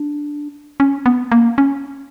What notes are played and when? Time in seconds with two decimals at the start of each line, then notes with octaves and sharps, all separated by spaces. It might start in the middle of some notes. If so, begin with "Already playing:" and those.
Already playing: D4
0.80 C#4
1.06 B3
1.32 A#3
1.58 C#4